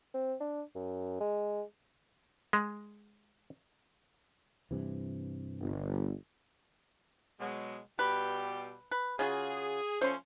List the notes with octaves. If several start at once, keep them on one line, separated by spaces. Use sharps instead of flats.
C4
D4
F#2
G#3
G#3
G2 C3 E3
G1
B2 F#3 G#3
B2 G3 G4 B4
B4
C#3 F4 F#4 G#4
F3 A3 C#4 C5 C6